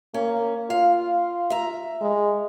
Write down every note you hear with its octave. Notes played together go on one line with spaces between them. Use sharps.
A#3 C#4
F4 F5
E5 A#5
G#3